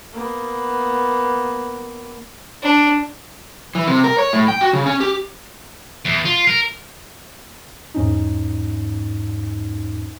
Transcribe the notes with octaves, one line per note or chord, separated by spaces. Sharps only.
A#3 B3
D4
E3
C3
A#4
C#5
A2
G5
F#4
C#3
C#4
G4
E2
F4
A#4
E2 G#2 C#4 D#4